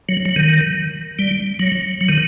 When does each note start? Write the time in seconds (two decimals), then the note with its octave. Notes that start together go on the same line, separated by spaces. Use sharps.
0.09 F#3
0.25 F#3
0.36 D#3
1.19 G3
1.59 F#3
2.01 F#3
2.08 D#3